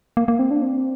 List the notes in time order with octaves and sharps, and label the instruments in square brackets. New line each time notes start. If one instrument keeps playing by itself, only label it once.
[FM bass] A#3
A#3
C4
D4
C4